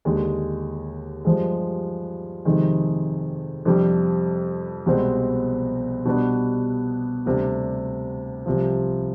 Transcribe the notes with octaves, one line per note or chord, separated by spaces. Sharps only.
D#2 D3 G#3
G2 F3 G#3
F2 C3 D#3 G#3
F2 C3 G3 D4 G4
C2 B2 G#3 C4
B2 G3 B3 D4
D2 C3 G3 D4
C2 C3 F3